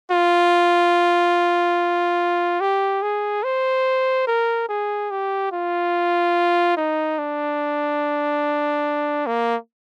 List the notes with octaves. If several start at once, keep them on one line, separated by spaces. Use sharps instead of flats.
F4
G4
G#4
C5
A#4
G#4
G4
F4
D#4
D4
A#3